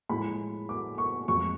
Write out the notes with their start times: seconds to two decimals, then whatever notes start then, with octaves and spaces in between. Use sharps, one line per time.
0.09 A2 F3 G#3 B5
0.69 D6
0.98 C#6
1.28 F2 F3 G#3 C#6